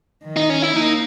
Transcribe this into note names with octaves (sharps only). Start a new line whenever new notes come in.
D#3
D#4
C#4
E4
A#3 D#4